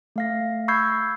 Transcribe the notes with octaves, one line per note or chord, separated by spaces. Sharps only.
A3 F5 A#6
B5 C#6 E6 G6 G#6 C7